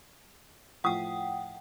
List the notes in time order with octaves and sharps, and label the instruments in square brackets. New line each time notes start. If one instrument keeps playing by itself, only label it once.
[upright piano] A2 F3 D#6 [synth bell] F#5 G5